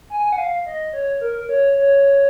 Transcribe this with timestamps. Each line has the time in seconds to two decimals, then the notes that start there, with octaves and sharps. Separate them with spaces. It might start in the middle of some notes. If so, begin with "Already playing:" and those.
0.10 G#5
0.32 F#5
0.38 F5
0.66 D#5
0.93 C#5
1.21 A#4
1.49 C#5
1.78 C#5